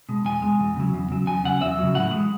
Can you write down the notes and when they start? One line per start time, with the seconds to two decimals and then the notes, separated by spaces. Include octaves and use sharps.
0.09 B2 G#3
0.25 E2 G#5
0.42 B2 G#3
0.60 E2
0.76 C#3 F#3
0.93 E2
1.10 C#3 F#3
1.27 E2 G#5
1.44 C#3 F#3 F#5
1.61 E2 E5
1.78 C#3 F#3
1.95 A2 F#5
2.12 E3 G#3